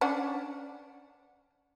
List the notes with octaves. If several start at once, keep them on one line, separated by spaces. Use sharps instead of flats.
C#4 D4 F#5